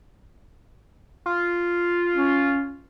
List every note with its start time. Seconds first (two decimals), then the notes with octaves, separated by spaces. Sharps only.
1.26 F4
2.16 C#4